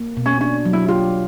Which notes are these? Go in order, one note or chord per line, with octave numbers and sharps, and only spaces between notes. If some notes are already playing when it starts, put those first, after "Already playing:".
Already playing: A#3
B2
C#4
C#4 D4
F#3
E4
F4 G4